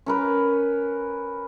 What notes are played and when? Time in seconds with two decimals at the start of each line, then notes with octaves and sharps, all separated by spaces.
0.06 C#4 A#4 B4